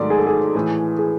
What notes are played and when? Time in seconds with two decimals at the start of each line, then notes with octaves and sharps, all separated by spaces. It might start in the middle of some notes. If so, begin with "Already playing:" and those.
Already playing: G#2 D#3 F#3 A3 D5
0.10 G#4
0.18 A4
0.27 G#4
0.55 A2 E3 A3
0.99 G#4